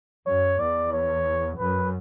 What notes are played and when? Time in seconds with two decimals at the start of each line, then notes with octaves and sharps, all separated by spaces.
0.26 F#2 C#5
0.59 E2 D5
0.93 C#5
1.58 F#2 B4